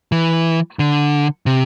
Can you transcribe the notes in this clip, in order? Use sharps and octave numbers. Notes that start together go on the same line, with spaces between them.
E3
D3
C3